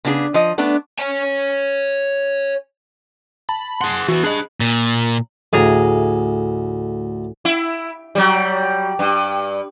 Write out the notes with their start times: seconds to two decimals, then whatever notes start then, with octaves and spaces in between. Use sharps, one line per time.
0.05 C#3 B3 D4 G4 G#4
0.34 F3 D#5
0.58 A3 B3 D4
0.99 C#5 G#5
3.49 A5 B5
3.81 G#4 F#5 C6
4.08 E3 B3 F#4
4.23 D4 G#4 D#5 B5 F#6
4.60 A#2
5.53 D2 A2 G#4 A#5
7.45 E4
8.15 F#3 G3
8.99 G2